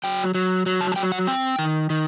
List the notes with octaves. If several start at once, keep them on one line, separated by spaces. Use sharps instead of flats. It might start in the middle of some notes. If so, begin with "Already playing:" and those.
F#3 G5
F#3
F#3
A5
A5
F#3 G5
F#5
C4 G5
D#3
D#3